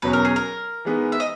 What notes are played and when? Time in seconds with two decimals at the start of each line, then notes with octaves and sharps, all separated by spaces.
0.02 E2 B2 F#3 C#4 B4
0.13 A#4
0.25 G#4
0.36 A#4
0.85 E3 G#3 B3 D#4
1.12 E5
1.20 D#5